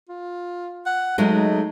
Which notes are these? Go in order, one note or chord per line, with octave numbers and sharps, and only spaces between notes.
F4
F#5
F#3 G#3 A3 D#4